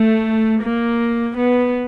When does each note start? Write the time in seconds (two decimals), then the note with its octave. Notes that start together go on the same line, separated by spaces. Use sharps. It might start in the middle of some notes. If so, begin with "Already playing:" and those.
Already playing: A3
0.61 A#3
1.38 B3